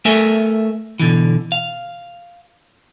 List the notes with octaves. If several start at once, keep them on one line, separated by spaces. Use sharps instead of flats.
A3 A4 A#4 E5 G#5
B2 D3 E3
F5